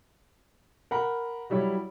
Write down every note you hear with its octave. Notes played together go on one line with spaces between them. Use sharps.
A#4 F#5 B5
F#3 G3 E4 C#5